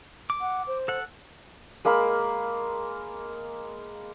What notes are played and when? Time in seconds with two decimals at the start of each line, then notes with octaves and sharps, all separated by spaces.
0.30 D6
0.41 F#5
0.67 C5
0.88 A4 F#5
1.85 G#3 A#3 F5 B5